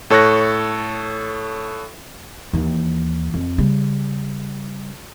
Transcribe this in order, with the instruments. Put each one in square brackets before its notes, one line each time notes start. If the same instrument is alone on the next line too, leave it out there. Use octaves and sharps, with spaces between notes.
[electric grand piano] A2 A4 C#5 C#6 F#6 A#6
[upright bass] D#2 E3
F2
C#3 G3